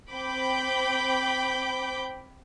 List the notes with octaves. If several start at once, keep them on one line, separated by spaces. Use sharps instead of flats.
C4 G5 B5 D6 G6